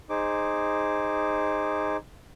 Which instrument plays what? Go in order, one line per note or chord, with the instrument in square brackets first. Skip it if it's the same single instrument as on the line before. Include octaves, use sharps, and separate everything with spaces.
[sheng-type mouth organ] D#4 G#4 C5 D6